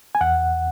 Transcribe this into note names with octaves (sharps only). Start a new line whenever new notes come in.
G#5
E2 F#5